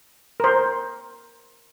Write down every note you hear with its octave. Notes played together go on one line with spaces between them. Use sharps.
A#4 C5